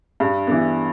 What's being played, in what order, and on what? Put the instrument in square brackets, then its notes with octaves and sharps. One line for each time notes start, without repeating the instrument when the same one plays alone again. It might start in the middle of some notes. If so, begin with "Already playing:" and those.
[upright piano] G2
E3 B3